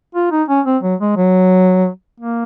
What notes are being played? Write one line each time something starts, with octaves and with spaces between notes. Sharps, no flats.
F4
D#4
C#4
C4
F#3
G#3
F#3
A#3